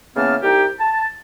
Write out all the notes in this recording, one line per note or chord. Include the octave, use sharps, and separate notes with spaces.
C#3 E3 A#3 B3 A5 F6
C2 D#4 G4
A5